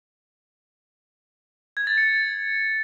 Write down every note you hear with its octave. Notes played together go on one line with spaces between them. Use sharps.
G#6
A6
C#7